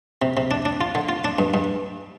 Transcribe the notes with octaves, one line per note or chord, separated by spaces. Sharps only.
C3
C3
D4
D4
F4
D3
F4
D4
G2
G2